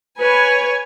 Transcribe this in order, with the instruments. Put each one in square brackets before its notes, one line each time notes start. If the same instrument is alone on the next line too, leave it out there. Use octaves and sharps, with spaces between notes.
[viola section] B4 [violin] C#5 G#5